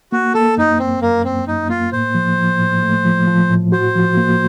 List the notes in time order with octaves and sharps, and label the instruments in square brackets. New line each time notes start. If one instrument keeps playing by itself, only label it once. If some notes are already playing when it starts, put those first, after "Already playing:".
[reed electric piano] A#3 [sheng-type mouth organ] F#4
[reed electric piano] A#3 [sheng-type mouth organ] A4
[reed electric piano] F#2 [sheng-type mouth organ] D#4
[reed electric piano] F#2 [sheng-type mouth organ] C4
[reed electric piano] F#2 [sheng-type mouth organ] A#3
[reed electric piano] F#2 [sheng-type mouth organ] C4
[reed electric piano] F#2 [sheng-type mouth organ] D#4
[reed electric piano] A#3 [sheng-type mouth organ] F4
[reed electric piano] A2 [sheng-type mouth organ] C5
[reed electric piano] F3
F3
A2
A3
F3
F3
A2
[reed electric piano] F#4 [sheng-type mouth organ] C5
[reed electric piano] F3
A#3